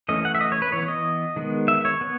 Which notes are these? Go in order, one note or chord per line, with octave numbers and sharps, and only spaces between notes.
E3 A3 C#4 D#5
F#5
E5
D#5
C#5
B4
E3 B3 C#5
D#5
D#3 G#3 B3
E5
C#5
B3